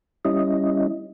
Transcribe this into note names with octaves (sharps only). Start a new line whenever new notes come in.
G3 C#4 E4 D#5